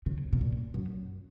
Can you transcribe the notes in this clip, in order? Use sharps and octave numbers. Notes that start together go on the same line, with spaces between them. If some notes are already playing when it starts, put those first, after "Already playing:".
C#3
B2
A#2
F#2